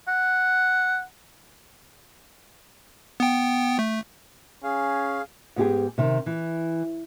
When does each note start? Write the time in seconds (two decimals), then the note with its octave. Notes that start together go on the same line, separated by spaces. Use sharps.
0.08 F#5
3.20 B3 G5
3.79 A3
4.64 C#4 G#4 F5
5.56 G#2 B3 G4 G#4
5.98 C3 D#3
6.26 E3